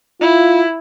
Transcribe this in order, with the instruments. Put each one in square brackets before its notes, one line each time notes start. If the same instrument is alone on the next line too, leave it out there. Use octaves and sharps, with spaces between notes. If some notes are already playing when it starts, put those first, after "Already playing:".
[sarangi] E4 [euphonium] F4